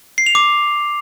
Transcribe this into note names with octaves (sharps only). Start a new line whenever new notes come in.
C7
F7
D6